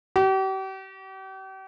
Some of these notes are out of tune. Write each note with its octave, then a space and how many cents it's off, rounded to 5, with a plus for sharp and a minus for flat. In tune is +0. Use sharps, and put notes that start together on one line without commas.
G4 -40